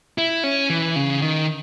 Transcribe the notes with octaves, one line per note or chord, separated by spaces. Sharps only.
E4
C#4
E3
C#3
D#3